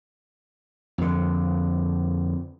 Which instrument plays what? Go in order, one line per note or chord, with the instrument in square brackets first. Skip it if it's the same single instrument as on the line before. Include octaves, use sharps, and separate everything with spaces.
[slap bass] F2 D3